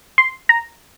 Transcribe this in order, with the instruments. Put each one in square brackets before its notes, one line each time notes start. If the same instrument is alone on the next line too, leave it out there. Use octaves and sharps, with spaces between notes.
[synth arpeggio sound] C6
A#5